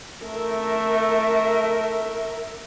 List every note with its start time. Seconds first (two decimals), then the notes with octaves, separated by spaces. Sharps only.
0.23 A3 A#4 E5